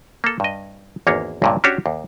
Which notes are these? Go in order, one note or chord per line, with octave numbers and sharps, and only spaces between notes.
A#3 A4
G2 D#5
G#1 E2 A#3 D4 C#5
C#2 G2 A#2
C#4 D4 F#4 G4 C#5
D#2